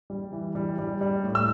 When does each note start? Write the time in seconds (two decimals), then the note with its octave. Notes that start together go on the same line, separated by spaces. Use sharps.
0.10 G3
0.32 E3
0.55 G3
0.79 G3
1.01 G3
1.24 A2
1.35 E6